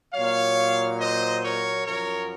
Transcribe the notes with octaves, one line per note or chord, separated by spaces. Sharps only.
A#2 F#3 C#5 F5
C5 D#5
A#4 C#5
F#2 F3 A#4 C#5